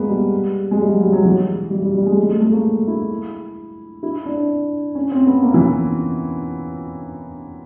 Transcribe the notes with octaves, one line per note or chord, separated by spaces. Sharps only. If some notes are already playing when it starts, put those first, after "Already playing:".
Already playing: G#3 A#3 B3
G3
G#3
G3
F#3
G3
F#3
E3
G3
G3
G3
G#3
G#3
A3
A3
A#3
E4
E4
D4
C#4
C4
B3
A#3
E3